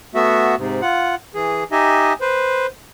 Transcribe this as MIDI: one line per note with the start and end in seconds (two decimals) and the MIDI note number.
0.15 0.55 57
0.15 0.55 59
0.15 0.55 66
0.15 0.55 76
0.58 0.81 44
0.58 0.81 48
0.82 1.15 65
0.82 1.15 78
1.35 1.64 52
1.35 1.64 68
1.72 2.13 63
1.72 2.13 67
1.72 2.13 75
1.72 2.13 76
1.72 2.13 80
2.21 2.67 71
2.21 2.67 72